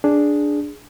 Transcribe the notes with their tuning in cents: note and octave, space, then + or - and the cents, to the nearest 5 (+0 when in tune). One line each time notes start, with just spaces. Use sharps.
D4 +0 G#4 +0